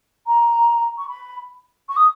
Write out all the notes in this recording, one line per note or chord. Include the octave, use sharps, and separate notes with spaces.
A#5
C#6
B5
C#6
D#6